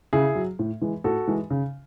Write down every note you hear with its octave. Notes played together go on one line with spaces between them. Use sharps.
C#3 E4 G#4
F#3
A2
E3 G#3
A2 F#4 A4
E3 G#3
C#3